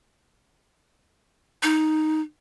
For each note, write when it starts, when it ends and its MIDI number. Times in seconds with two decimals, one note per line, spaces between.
1.63 2.21 63